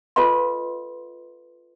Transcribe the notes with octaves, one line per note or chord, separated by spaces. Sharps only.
F4 A4 B4 D#5 F5 C6